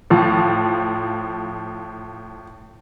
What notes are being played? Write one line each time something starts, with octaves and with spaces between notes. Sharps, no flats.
A2 F3